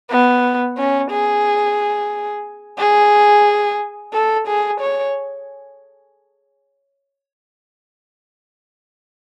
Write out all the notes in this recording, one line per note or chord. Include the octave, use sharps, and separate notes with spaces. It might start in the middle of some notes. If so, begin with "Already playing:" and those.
B3
C#4
G#4
G#4
A4
G#4
C#5